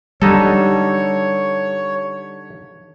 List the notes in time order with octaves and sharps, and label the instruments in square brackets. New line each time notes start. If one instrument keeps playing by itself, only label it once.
[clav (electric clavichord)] D3 D#4 A4 [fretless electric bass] G3 [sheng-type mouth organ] C#5